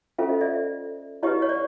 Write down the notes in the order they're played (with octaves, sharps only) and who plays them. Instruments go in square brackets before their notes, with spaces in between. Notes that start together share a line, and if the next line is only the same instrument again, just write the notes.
[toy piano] C#4 F4 A4 C5 E5
D#5
D5 E5
E4 G4 B4 C#5 D#5
C#5
D5